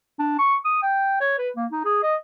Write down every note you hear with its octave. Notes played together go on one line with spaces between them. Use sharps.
D4
C#6
D#6
G5
C#5
B4
A#3
D#4
G#4
D#5